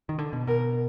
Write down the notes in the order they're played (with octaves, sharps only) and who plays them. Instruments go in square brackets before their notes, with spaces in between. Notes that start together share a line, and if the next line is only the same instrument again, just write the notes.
[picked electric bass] D#3
D3
B2
[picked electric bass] B2 [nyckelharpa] A#4